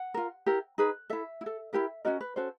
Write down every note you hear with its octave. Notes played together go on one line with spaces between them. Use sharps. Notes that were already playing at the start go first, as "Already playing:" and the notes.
Already playing: F#5
F4 A#4
E4 G4 A#4
D#4 G#4 B4
E4 A4 E5
E4
A4
E4 G4 A#4 E5
C#4 F#4 A#4 D#5
B4
C#4 F#4 A4 C5